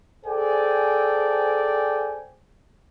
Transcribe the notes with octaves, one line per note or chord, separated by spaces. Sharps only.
G#4 A4 C5 D5 G5 G#5